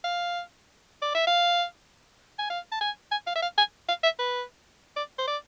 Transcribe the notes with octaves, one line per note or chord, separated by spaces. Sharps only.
F5
D5
E5
F5
G#5
F5
A5
G#5
G#5
F5
E5
F5
G#5
F5
E5
B4
D5
C5
D5